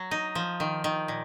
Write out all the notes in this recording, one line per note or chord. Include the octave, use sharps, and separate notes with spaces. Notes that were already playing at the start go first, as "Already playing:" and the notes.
Already playing: F#3
D#4
F3
D#3
D#3
A#2